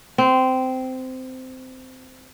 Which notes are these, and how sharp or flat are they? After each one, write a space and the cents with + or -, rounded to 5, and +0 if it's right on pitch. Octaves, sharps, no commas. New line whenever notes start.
C4 -15